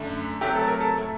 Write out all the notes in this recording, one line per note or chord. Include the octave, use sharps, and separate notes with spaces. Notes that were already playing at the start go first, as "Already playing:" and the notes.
Already playing: F#2 D3 A3
C3 F#3 A3 G4
A4
A#4
A4
A2 A3